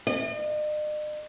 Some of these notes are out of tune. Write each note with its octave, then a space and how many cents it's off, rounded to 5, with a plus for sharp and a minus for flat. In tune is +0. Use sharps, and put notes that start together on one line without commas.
D#5 -45